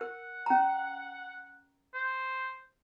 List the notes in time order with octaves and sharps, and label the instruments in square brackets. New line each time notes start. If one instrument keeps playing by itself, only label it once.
[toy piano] A#4 [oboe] F#5
[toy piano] C#4 A#5
[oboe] C5